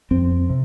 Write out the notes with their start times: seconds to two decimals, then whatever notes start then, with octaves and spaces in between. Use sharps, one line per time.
0.11 F2 C4
0.49 C3